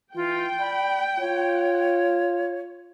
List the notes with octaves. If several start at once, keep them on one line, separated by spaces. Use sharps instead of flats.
E3 F4 G5
D5 B5
F4 C#5